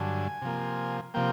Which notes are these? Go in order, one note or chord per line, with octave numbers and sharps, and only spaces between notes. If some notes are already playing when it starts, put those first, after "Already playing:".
Already playing: G2 D3 F#3 G#5
C3 F3 A#3
C3 F3 A#3 G5